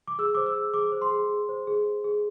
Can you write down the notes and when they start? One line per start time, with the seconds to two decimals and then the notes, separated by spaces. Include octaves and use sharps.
0.08 D6
0.19 G#4 E6
0.34 C5 D6
0.46 E6
0.56 G#4
0.74 G#4 D6
0.92 C5
1.02 C6
1.11 G#4
1.29 G#4
1.49 C5
1.67 G#4
1.85 C5
2.04 G#4